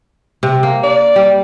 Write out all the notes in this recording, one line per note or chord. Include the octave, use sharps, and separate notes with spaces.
C3
A#3
D5
G3